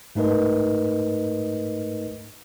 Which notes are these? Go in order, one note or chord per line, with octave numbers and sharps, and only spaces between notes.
G#2 A3 D#4 A#4 B4 D#5